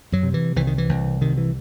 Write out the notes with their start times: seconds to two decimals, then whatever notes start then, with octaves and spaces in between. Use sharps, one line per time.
0.12 F#2 F#3
0.23 C3
0.34 E3
0.56 C2 E3
0.67 D#3
0.78 E3
0.89 C2
1.21 C3 D#3
1.37 E3